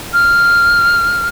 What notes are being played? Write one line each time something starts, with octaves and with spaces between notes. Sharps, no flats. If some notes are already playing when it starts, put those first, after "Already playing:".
F6